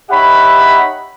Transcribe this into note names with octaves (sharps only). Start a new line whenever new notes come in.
D#4 G4 C#5 E5 F#5 B5